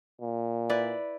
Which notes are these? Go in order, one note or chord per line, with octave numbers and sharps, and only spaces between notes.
A#2
E4 B4 D5